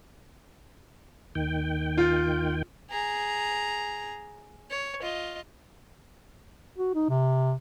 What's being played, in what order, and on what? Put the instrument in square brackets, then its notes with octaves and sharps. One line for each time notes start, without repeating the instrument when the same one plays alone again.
[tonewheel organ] D#2 D#3 G5
[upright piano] F4
[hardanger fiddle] G#4 A#5
C#5
F4 D#5
[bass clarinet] F#4
D#4
C3